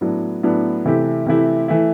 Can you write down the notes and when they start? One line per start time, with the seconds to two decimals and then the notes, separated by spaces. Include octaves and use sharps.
0.01 A2 F#3 B3 D4
0.43 A2 F#3 B3 D4
0.86 C3 E3 A3 E4 G4
1.26 C3 E3 A3 E4 G4
1.68 E3 A3 E4